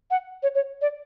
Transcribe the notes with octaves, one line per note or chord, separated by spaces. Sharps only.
F#5
C#5
C#5
D5